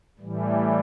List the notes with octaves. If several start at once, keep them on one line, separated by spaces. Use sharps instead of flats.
A2 E3 G3